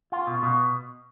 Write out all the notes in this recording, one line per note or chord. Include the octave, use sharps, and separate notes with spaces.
F4
B2
B2